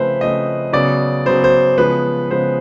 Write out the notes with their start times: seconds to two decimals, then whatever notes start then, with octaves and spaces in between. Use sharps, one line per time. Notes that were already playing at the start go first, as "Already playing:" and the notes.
Already playing: C#3 F3 A3 C4 B4 C5
0.21 C#3 F3 A3 C4 D#5
0.73 C#3 F#3 B3 D5
1.26 C#3 F#3 B3 C5
1.44 C5
1.78 C#3 F3 G#3 B3 B4
2.31 C#3 F3 G#3 B3 C5